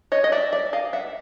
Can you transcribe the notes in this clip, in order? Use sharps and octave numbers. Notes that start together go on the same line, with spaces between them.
C#5 D#5
D#5
D5 E5
D5 E5
D#5 F5
E5 F#5